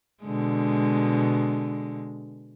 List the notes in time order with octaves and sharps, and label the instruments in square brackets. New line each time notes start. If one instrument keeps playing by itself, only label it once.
[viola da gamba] B2 D3 G#3